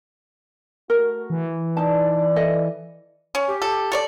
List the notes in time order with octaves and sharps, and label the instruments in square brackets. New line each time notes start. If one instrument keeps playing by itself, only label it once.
[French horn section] A3 F#4 [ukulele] A#4
[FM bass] E3
[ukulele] D#4 A5 [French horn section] D5
[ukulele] A4 D#5 E5
[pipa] C#4
[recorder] G4
[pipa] A4
A4 C#5 D5